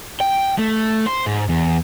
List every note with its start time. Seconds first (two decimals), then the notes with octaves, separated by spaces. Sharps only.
0.20 G5
0.58 A3
1.07 C5
1.26 G#2
1.49 E2